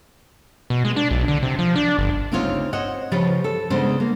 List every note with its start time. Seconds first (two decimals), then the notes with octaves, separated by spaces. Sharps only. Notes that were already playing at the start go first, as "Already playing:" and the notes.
0.70 B2
0.85 G#3
0.96 D4
1.11 B1
1.28 D3
1.43 C3
1.59 F3
1.76 D4
1.99 G1
2.32 D2 C#3 C4 D#4 F4 C#5
2.73 C5 C#5 D#5 F#5
3.12 C#3 F3 F4 G4 B4 C#5
3.44 A4
3.70 C#3 G#3 B3 D4 C5
4.00 A#3